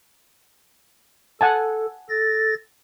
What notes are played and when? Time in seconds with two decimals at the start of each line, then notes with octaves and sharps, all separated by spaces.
1.41 A4 F#5 G#5 A5
2.09 A4 A6 A#6